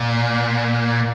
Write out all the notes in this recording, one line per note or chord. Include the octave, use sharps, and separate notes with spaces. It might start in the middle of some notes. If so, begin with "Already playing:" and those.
Already playing: A#2